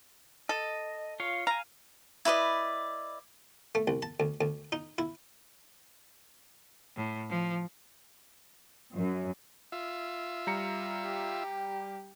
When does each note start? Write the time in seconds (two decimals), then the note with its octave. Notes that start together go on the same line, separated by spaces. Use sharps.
0.49 A4 D#5
1.20 F4 C#5 F5
1.47 F5 G#5 A#5
2.25 E4 B4 D5 D#5
3.75 A3
3.88 C2
4.02 A5
4.20 D2
4.41 D2
4.72 D#4
4.98 E4
6.96 A2
7.30 F3
8.95 F#2
9.72 F4 E5
10.47 G3 A#5 C#7
11.04 G4